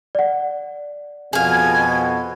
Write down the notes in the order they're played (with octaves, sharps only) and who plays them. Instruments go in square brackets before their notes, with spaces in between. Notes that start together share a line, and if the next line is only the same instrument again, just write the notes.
[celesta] D5 F#5
[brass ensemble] F2 B2 [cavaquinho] G#4 F5 [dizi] G#5